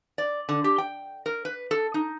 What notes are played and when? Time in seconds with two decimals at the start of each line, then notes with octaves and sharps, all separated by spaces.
0.18 D5
0.49 D3
0.64 G4
0.78 G5
1.26 A#4
1.45 B4
1.71 A4
1.94 D#4